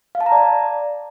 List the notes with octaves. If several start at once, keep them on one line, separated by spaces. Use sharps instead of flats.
F5
A5
A#5
D5